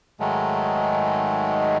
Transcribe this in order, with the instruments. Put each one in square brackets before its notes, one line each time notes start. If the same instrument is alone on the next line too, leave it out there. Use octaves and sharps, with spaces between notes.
[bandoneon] G#2 D#3 F#3 G#3 A3